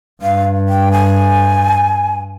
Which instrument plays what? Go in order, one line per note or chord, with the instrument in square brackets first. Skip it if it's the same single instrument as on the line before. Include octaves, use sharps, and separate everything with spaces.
[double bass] G2 [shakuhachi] F5
[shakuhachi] G5
G#5